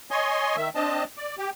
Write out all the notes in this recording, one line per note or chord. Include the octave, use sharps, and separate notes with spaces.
C#5 D#5 G#5 C6
D#3 E5
C4 D4 D#5 A5
D5
G4